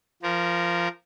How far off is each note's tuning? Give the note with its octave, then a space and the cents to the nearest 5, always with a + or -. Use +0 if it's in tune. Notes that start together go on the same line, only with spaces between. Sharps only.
F3 -15 A#4 +0